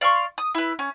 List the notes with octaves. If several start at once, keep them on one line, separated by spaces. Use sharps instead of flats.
D5 F5 C6 C#6
D#6
E4 B4
C#4